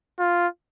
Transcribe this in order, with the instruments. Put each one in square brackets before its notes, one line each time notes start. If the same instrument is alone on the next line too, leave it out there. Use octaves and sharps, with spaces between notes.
[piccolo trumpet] F4